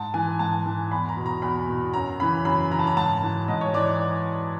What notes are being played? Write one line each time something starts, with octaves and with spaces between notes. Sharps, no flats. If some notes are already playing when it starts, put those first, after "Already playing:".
Already playing: G#2 A5
E3 G#5
G#2 A5
E3
E2 B5
A#5
B2
A#5
E2 B5
B2
F#2 A#5
C#3 E3 B5
F#2 B5
C#3 E3 A#5
A5
A#5
G#2 A5
E3
G#2 D#5
C#5
E3 D5